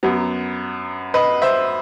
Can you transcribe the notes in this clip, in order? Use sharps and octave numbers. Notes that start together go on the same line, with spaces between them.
F#2 F#3 B3
B4 D#5
C5 E5